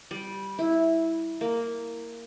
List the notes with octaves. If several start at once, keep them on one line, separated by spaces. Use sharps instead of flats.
G3
E4
A#3